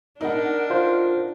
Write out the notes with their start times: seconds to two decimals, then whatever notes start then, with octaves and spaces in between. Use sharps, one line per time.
0.21 D4 D#4 A#4 F#5
0.70 F4 C5